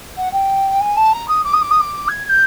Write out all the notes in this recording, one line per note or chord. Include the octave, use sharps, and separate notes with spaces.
F#5
G5
G#5
A5
A#5
D#6
D6
D#6
D6
D#6
D6
G#6
G#6
G6